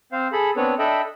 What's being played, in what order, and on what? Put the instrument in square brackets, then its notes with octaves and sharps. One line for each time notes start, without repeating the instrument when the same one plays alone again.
[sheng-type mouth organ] C4 C5 F5
G#4 A4 B5
B3 C4 D4 B4 C#5
D4 A4 D#5 E5 G5 B5